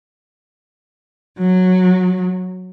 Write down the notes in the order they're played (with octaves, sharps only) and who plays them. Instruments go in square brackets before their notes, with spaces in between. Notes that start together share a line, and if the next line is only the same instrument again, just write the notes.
[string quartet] F#3